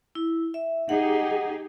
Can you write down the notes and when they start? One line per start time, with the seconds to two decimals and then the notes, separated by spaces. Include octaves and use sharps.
0.15 E4
0.54 E5
0.89 D#4 G4 G#4 F#5